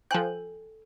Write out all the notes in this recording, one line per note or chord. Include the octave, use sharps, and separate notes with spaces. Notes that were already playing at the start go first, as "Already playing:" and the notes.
F3 A4 G5 G#5 F#6 G6